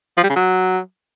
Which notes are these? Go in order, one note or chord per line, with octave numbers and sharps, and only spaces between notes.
F3
G3
C#3
F#3